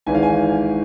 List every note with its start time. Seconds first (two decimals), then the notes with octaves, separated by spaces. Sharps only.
0.06 G#1 G#2 E3 G#5
0.15 F5
0.23 G#5